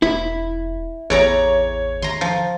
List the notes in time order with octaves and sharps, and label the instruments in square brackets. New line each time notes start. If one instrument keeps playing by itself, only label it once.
[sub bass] E1 [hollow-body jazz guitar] E4
[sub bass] A1 [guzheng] E2 D5 A#5 [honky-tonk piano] C#5
[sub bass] D#3 [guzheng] A#5 C6
[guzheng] F3